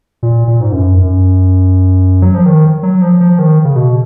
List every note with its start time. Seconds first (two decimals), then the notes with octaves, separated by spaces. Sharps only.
0.23 A#2
0.47 A#2
0.60 G#2
0.72 F#2
0.97 F#2
2.22 F#3
2.34 F3
2.46 D#3
2.83 F#3
3.02 F3
3.21 F3
3.39 D#3
3.65 C#3
3.76 B2